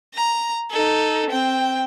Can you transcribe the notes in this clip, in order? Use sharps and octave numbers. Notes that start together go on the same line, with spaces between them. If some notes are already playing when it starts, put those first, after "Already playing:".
A#5
D#4 A4
C4 G5